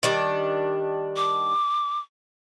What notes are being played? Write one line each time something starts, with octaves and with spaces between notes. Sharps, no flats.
D#3 G3 D4
D6